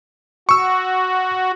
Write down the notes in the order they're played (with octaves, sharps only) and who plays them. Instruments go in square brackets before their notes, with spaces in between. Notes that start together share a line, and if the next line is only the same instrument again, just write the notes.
[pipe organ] F#4 [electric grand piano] C#6 E6